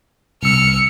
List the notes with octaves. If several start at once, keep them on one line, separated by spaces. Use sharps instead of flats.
C2 E6 F6 C#7